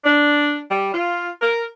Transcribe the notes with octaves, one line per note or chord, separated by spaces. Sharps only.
D4
G3
F4
A#4